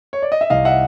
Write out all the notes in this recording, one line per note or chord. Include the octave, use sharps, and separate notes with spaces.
C#5
D5
D#5
E5
C2 D#5 F5
E5 F#5